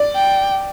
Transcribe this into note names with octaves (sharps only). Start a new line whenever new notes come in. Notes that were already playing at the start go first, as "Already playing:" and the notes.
Already playing: D5
G5